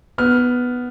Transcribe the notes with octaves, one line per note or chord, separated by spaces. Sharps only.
B3 F6